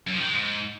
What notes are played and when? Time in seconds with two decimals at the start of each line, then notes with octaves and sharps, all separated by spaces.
0.07 F#2
0.14 F3
0.21 D#3
0.27 G#3
0.34 G#2